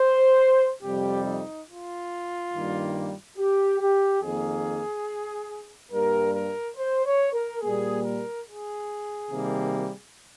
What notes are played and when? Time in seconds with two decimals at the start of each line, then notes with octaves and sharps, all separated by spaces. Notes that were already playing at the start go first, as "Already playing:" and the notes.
Already playing: C5
0.82 F2 C3 G3 G4
1.25 D#4
1.67 F4
2.52 G2 D#3 G3 A#3
3.37 G4
3.79 G4
4.21 F2 D#3 A#3 G#4
5.91 G2 G3 A#3 A#4
6.33 A#4
6.77 C5
7.04 C#5
7.32 A#4
7.60 A#2 G3 A#3 G#4
8.03 A#4
8.46 G#4
9.30 C3 D#3 G3 A#3